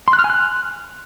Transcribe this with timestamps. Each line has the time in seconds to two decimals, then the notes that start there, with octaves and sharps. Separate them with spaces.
0.08 C6
0.13 F#6
0.19 F6
0.24 G#5
0.30 F#6